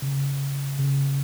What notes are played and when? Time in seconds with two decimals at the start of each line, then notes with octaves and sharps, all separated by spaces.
0.02 C#3
0.79 C#3